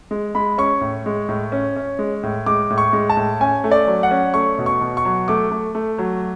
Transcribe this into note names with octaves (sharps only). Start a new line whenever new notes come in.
G#3
G#3 B5
C#4 C#6
A2
G#3
A2
C#4
C#4
G#3
A2
G#3 D6
A2
C#6
G#3
A5
A2
C#4 G#5
A3
D5
F#3
F#5
C#4
A3 C#6
B2
C#6
B2
C#6
F#3
A3 D6
A3
A3
F#3